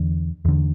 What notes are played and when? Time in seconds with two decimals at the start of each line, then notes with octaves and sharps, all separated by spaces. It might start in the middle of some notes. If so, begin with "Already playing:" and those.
Already playing: E2 D3
0.45 E2 D3